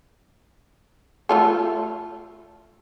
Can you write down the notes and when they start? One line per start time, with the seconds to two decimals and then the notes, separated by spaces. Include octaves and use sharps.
1.29 A3 F4 A4